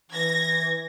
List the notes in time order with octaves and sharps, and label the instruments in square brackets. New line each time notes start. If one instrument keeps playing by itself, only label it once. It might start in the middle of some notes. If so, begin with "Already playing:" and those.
[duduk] E3 [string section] G#6 A#6